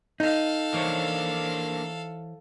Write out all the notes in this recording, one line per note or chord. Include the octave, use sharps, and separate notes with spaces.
D#4 A4 F5
E3 A#3 D4 C5 C#5